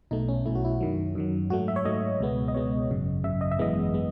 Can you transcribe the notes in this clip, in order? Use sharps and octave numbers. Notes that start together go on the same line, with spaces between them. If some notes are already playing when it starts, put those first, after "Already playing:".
B1 B2 A3 D#4
C#4
B1 B2 A3 E4
F#4
E4
F#2 D#3 F#3
F#2 D#3 F#3
G#2 F#3 A3 F#4
E5
C#5
G#2 F#3 A3 D#5
C#2 B2 G#3 B3
D#5
C#2 B2 G#3 B3 C#5
G#1 F#2 C#3
G#1 F#2 C#3 E5
D#5
E5
G#1 F#2 E3 G#3 B3 D#5
G#3 B3